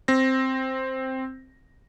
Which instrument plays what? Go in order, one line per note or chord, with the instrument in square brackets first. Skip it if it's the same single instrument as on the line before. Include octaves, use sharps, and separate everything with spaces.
[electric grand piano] C4 A#6